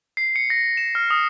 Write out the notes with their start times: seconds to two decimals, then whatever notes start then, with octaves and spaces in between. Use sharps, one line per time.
0.17 C7
0.36 C#7
0.50 A#6
0.77 E7
0.95 F6
1.10 D#6